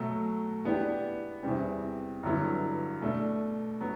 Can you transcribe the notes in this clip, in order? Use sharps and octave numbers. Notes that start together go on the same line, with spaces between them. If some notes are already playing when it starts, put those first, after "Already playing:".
Already playing: B2 F#3 A3
E3 B3 D4 G4
E2 C3 G3 C4
G2 D3 F#3 B3 E4
B2 A3 D4
F#3 B3